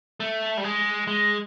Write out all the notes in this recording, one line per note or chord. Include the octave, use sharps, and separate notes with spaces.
A3
G3
G#3
G#3